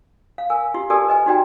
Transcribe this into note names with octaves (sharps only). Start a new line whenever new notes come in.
F5
A#4 G#5
F4 G4
G4 A4 A#4 D5 G#5 A5
B4 D#5 G#5
D#4 F#4 D5 G5 A#5